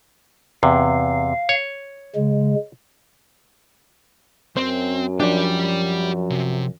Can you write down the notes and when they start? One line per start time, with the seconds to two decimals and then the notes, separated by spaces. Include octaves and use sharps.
0.63 E2 C3 F5
1.49 C#5
2.16 C#3 G#3
4.57 F#2 C4 C5
5.20 F3 D4 G4 D5
6.30 C3